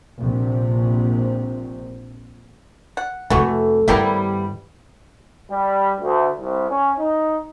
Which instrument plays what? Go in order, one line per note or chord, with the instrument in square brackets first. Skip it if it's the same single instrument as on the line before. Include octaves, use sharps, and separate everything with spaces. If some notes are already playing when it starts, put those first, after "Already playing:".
[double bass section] A#1 C3
[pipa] F#5
[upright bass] F2 C3 [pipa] E3 F#4 [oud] A3
[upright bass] G2 D#3 [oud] G3 B3 E4 [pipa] A#3 G4 A#4
[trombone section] G3
D2
C2
C#4
D#4